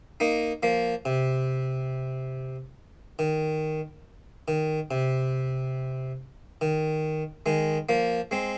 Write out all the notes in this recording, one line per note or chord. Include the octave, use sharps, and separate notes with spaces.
A#3 D#4
F3 A#3
C3
D#3
D#3
C3
D#3
D#3 G#3
F3 A#3
G#3 C4